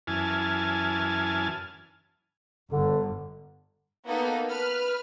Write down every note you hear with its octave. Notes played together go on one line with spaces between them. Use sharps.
F#2 E3 G#5 A5 F6
G1 D3
A#3 B3 D#4 A4
B4 F6